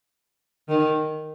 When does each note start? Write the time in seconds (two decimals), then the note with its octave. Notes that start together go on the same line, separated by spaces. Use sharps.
0.69 D#3